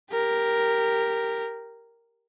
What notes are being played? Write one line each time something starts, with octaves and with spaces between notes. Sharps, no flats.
G4 A#4